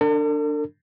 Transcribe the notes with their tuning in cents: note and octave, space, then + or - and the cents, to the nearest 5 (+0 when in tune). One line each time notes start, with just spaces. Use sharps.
D4 +5 A4 +45